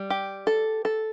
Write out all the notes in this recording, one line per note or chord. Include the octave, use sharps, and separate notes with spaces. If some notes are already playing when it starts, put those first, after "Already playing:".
Already playing: G3
G4
A4
A4